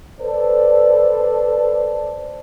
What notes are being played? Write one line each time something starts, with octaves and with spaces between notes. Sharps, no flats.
A4 B4 C5 D5